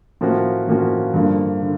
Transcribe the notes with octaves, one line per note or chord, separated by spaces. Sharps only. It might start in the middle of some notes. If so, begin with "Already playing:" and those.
A2 F3 A#3 C#4 F#4
A2 F3 A#3 C#4 F#4
G2 D3 F3 A#3
D3